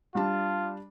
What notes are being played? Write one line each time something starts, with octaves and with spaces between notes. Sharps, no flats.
G3 D4 F4 A5